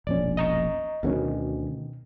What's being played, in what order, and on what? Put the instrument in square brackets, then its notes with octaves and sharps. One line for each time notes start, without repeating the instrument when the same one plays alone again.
[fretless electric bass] E1 A#1 C#4 [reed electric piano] D5
[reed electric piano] D#5 A#5 C#6
[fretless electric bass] D2 A3 C#4 [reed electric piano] B2 D#3